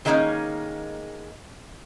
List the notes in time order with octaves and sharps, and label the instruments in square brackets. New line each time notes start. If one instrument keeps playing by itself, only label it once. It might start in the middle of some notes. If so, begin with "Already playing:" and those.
[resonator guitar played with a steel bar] D#3 F#3 G#3 A#3 C#4 D#4